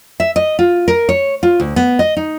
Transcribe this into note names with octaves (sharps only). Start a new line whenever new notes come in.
E5
D#5
F4
A#4
C#5
F4
D2
B3
D#5
D#4